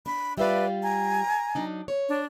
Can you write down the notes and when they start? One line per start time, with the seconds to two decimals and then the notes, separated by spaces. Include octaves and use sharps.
0.06 D4 B5
0.38 G3 F4 B4 D5 E5 F5
0.82 G#5 A#5
1.55 F#3 D4 D#4
1.88 C#5
2.09 D4